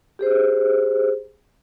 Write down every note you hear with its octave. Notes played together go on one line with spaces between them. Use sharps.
G4 G#4 C5